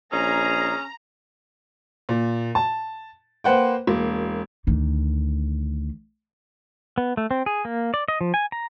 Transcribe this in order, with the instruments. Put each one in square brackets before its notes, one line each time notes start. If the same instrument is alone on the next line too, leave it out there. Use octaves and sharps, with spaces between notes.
[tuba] A#1 [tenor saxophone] C#4 [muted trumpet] G#4 [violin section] A#5
[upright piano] A#2
A5
A#3 B4 C5 F#5 G5
E1 A#3
[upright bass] D2 D#3
[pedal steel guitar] B3
A3
C4
G#4
A#3
D5
D#5
F3
G#5
A#5